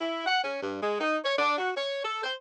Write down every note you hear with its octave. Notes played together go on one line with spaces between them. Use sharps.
E4
F#5
C#4
G2
G#3
D#4
C#5
D4
F#4
C#5
A4
C5